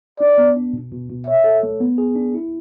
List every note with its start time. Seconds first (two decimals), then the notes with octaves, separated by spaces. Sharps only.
0.20 D4 D5
0.38 B3
0.56 D4
0.73 B2
0.92 B2
1.10 B2
1.27 C#5 E5
1.44 A4
1.63 A3
1.80 B3
1.98 G#4
2.16 D4
2.35 E4